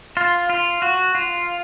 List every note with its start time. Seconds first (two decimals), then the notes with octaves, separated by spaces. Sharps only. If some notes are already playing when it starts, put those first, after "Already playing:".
0.17 F4
0.49 F4
0.82 F#4
1.15 F4